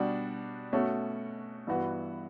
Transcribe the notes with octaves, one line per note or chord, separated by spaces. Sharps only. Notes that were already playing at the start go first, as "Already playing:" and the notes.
Already playing: B2 G3 D4 F#4
B2 A3 C#4 F#4
G2 E3 B3 F#4